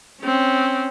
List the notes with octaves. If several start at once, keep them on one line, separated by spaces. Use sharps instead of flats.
C4 C#4